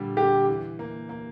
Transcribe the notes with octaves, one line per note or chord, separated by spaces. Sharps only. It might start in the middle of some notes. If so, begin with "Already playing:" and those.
Already playing: A#2 D3 G3
D3 G4
E3
A#3
A#3